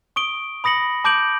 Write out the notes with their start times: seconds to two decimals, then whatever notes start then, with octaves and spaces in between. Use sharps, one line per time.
0.16 C#6 D#6 D7 G7
0.64 B5 D#6 A#6 C#7 F#7
1.04 A5 D6 G6 D7 F#7